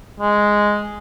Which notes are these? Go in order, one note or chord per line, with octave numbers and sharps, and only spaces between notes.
G#3